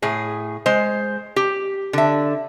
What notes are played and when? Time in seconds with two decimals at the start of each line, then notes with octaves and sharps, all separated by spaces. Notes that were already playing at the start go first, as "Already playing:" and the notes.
0.02 A2 G#4
0.66 G#3 C5
1.36 G4
1.93 D3 E5